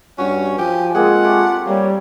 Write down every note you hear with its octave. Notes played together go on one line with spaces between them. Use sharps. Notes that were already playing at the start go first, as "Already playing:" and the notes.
G2 C#4 F#4
F3 G4 G#5
G#3 A#3 C4 F4 G#4 F#5
A3 G4
G3 A#3 C#5